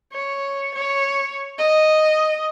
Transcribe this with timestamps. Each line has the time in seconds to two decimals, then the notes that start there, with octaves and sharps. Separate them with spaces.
0.13 C#5
0.75 C#5
1.58 D#5